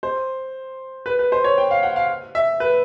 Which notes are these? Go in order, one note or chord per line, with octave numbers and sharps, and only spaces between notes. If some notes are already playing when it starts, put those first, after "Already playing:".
C5
B4
B4
C5
C#5
G5
F5
F#5
F5
E5
B4